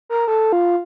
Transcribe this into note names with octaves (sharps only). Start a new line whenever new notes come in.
A#4
A4
F4